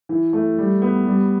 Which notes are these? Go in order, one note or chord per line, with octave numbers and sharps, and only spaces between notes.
E3
A3
G3
B3
G3